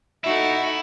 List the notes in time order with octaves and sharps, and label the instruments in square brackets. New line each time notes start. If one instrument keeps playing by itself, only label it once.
[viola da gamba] D#4 F#4 A4 [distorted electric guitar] E4 [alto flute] E5